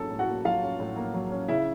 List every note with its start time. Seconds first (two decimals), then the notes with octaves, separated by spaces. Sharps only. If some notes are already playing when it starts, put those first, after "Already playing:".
Already playing: A2 F#3 A#3 C#4 A4 A5
0.11 A2
0.19 F#4 F#5
0.28 A#3
0.45 F#3 F4 F5
0.63 C#4
0.80 A2
0.96 A#3
1.14 F#3
1.31 C#4
1.48 C#3 E4 E5